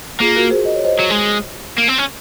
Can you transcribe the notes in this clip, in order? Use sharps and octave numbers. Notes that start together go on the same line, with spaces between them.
A#3 F4 G#4
F#4 A#4
G#4 C5
D#5
C#5
C5 D#5
F#3
G#3
A#3
C4
C#4